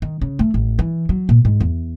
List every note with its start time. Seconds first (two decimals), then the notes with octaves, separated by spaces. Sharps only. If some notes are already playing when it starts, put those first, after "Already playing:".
0.02 D#3
0.22 C#3
0.39 A3
0.54 A1
0.79 E3
1.09 F#3
1.29 A#2
1.45 G#2
1.61 E2